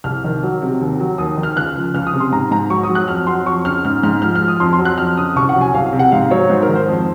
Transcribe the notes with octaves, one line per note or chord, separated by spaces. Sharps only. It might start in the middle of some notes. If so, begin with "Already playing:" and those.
C2 F6
D#3
F#3
C3
D#2
F#3
D#2 D#6
D#3
F6
C#2 F#6
F3
C#2 F6
D#6
C3
C6
G#2 A#5
G#2 A#5
F#3 C#6
D#6
F#3
F#6
F2 F6
F#3 C6
F2 C#6
C#3 F6
G#2 F6
G#2 F6
F3 F6
F6
F3
D#6
F2 C6
C6
F#3
F#6
F2 F6
C#3 D#6
C2 C#6
F#5
F#3
G#5
C2 F5
F5
C3
F#5
G#2 F5
F#3 C#5
G#2 C5
A#4
D#3
C5
F2